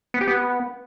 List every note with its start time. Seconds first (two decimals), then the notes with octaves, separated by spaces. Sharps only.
0.14 B3
0.21 G4
0.28 B3